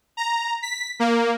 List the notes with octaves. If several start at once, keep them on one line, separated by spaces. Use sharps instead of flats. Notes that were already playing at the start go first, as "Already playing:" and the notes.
A#5
B6
A#3